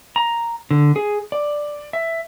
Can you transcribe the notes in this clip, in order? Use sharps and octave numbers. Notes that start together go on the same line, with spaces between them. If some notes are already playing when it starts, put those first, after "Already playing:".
A#5
D3
G#4
D5
E5